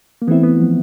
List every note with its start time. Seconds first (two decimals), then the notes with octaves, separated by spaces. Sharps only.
0.22 A#3
0.28 E3 A3 B3 C4 E4
0.43 B3
0.59 F3